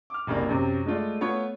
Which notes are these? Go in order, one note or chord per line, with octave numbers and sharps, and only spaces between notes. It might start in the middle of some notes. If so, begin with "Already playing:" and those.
D6 F6
F#1 C2 A#3 D4
F#2 C3
G#3 A3 F4 D5
A3 B3 F4 C#5